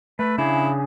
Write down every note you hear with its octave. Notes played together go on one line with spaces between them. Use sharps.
A3 B4
C#3 D4 E4 G#4